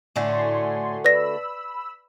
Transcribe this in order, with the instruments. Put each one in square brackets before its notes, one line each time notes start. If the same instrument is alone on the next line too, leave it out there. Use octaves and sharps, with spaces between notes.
[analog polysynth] A2 G#5 C6 [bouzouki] D3 A3 F#4
[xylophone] B4 D5 A#6 [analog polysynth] B5 E6